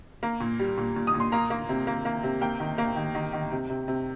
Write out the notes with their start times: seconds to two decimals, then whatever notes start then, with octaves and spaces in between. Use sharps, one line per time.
0.23 A#3
0.40 A#2
0.59 G3
0.78 A#2
0.96 A#2
1.07 D#6
1.14 A#2
1.20 C6
1.32 A#3 A#5
1.50 A#3
1.69 C3
1.87 A#3
2.05 A#3
2.23 C3
2.41 A#3 G5
2.60 D#3
2.78 A#3
2.96 D#3
3.15 D#3
3.33 D#3
3.52 C3
3.70 C3
3.88 C3